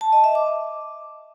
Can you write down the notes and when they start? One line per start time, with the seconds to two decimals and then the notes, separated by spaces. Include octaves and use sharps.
0.01 A5
0.12 D#5
0.24 E5
0.35 D6